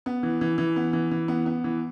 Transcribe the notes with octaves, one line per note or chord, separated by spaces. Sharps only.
B3
E3
E3
E3
B3
E3
E3
B3
B3
E3